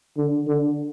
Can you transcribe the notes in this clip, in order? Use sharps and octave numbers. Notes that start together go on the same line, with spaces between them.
D3
D3